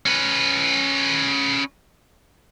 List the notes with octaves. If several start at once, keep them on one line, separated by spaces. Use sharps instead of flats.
C#4 B4